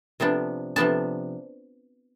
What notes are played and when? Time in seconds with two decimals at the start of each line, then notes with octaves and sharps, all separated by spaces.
0.20 C3 F3 B3 D4
0.76 C3 F3 B3 D4 A5